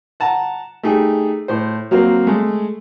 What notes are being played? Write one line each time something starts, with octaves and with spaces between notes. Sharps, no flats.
F#5 A5 A#5
A3 D#4 G4 G#4
A2 C5
F#3 A#3 C4 C5
G#3 A3